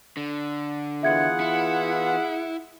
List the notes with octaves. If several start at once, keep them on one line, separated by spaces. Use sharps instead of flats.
D3
E3 B3 F4 G#4 E5 F#5 G#6 C#7
E4 C#7